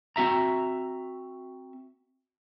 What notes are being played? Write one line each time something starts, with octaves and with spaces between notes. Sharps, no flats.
C4 F#4 E5 A#5